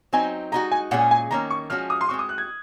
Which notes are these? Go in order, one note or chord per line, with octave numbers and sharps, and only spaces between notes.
F#3 C4 D#4 G#5
G#3 D#4 F#4 A#5
G#5
A#2 G#3 C#4 G#4 F#5
G#5
D#3 A#3 C#4 A#5
C#6
F3 G#3 C#4 F#4 F6
D#6
C6
G#3 C4 F#4 C#6
D#6
F#6
G#6